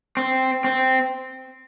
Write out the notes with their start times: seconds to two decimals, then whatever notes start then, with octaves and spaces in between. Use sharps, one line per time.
0.17 C4
0.64 C4